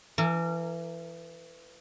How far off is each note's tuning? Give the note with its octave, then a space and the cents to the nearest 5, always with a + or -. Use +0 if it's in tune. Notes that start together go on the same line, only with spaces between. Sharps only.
E3 +25 A#4 -35